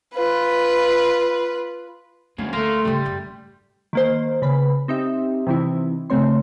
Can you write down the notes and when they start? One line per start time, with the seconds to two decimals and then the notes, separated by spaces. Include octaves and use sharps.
0.15 F4 B4
2.38 D2 G#3 A#3 C#4
2.53 D2 A3 A#4 F5 C6
2.85 G#2 C#3 G3
3.05 F#2 A3
3.93 D#3 A#3 C5
4.42 C#3 B4 B5
4.88 C4 D#4 G4 E5
5.47 C3 E3 C4 D#4 E4
6.10 C#3 A3 C4 C#5 C6